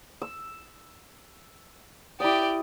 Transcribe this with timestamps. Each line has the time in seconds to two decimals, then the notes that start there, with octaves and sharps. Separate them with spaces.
0.22 E6
2.20 E4 G4 D5 D#6